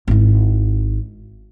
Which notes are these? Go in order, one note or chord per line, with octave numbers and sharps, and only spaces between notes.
G#1 E4